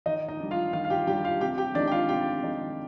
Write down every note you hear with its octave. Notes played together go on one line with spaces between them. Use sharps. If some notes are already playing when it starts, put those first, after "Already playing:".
D#3 D#4 D#5
D#4 D#5
G3 D4
F4 F5
D#3 F4 F5
F5
G4 G5
G3 D4 G4 G5
F4 F5
C3 G4 G5
G4 G5
D#3 G#3 D4 D#4 D5
G5
F4 F5
C3 G4 G5
D#3 G#3 D#4